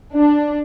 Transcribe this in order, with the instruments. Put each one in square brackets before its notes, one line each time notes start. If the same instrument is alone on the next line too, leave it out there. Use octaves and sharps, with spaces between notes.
[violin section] D4